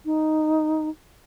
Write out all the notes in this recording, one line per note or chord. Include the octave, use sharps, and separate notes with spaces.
D#4